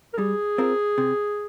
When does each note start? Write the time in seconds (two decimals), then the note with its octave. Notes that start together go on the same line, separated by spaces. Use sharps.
0.14 A#4
0.18 G3 G#4
0.58 C4 F4 A#4
0.98 C3